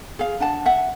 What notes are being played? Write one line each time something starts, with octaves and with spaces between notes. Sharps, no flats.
G#4 F5
D4 F#5 A5
E5 F#5